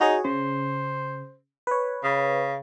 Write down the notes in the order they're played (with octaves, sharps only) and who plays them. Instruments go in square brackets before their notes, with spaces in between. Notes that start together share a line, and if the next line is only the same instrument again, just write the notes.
[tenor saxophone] D#4 [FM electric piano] F#4 G#4 C#5
[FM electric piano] C#3 [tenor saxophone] C5
[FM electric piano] B4 C#5
[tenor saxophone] C#3